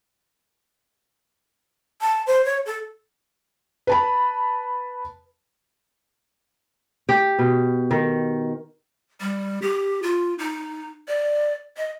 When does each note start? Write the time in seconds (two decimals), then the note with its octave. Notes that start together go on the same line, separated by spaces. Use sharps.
2.01 A5
2.27 C5
2.45 C#5
2.66 A4
3.87 B4 A5 B5
7.09 G4
7.39 B2
7.91 D#3
9.20 G3
9.62 G4
10.02 F4
10.39 D#4
11.08 D5
11.77 D#5